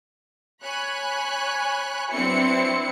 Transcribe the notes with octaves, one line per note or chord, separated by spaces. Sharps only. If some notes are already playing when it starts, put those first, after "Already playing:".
C#5 G#5 B5 F#6
F#3 C4 D4 E4 B4 C#7